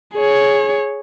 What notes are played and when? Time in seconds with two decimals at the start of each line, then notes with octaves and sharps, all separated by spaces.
0.15 G#4 C#5